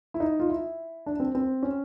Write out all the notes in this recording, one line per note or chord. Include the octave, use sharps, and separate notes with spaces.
E4
D#4
F4
E4
D4
C4
C4
C#4